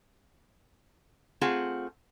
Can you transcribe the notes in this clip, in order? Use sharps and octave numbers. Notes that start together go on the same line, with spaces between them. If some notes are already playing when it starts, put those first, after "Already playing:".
A3 C4 F4 G#4 F#5